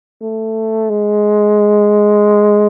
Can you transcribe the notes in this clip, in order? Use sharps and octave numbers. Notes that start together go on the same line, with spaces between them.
A3
G#3